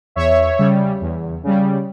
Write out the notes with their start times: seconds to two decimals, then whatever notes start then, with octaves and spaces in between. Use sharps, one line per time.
0.16 E2 C#5 E5
0.59 C#3 G3
1.01 E2
1.43 C#3 G3